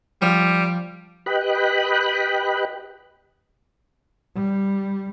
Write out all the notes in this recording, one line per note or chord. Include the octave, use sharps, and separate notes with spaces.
F3 G3
G4 B4 D#5 G5 B5 F#6
G3